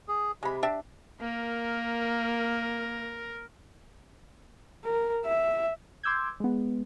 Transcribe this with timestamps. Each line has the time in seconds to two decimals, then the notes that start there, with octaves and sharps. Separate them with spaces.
0.08 G#4
0.43 C3 G#3 B5
0.63 D4 G4 E5
1.21 A#3 A#4
4.85 A#4
5.25 E5
6.03 C6 D6 E6 G6 G#6
6.40 G#3 B3